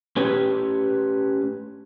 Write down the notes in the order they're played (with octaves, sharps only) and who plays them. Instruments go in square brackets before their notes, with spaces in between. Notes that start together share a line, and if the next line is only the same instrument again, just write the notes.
[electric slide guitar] A3 C#4 G4 B4 C#5